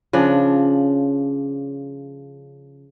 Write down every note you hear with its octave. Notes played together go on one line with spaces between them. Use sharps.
C#3 F3 D4